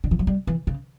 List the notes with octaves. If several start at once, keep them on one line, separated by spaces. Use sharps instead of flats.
D3
E3
F#3
G3
E3
C#3